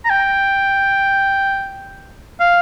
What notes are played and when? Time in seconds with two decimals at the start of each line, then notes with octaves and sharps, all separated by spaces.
0.05 A#5
0.10 G5
2.40 F5